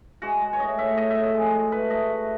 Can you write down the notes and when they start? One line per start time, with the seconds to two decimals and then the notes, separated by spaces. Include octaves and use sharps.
0.22 G#3 F#4
0.41 G#3
0.53 C#5
0.60 A2 D#5
0.78 A2 E5
0.97 A2 D#5
1.10 E5
1.15 A2
1.23 D#5
1.34 G#3
1.53 G#3
1.72 A3 B4
1.90 A3 D#5
2.10 A3